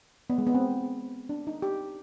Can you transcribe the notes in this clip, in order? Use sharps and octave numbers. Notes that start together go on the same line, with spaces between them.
B3
G#3
B3
C4
D4
D#4
G4